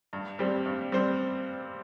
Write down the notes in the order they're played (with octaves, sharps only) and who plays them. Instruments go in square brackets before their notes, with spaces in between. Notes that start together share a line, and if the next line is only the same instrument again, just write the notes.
[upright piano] G2
G3 C4 G4 C5
G2
G3 C4 G4 C5